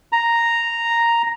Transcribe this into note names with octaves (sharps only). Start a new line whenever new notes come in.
A#5